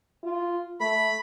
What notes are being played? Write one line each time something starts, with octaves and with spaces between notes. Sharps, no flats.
F4
A3 B5